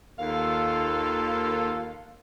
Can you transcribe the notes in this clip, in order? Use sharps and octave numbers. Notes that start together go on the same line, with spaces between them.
D#2 F4 A4 F5